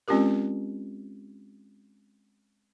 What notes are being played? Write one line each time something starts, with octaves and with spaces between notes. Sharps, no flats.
G#3 C4 C#4 F4 G4 A#4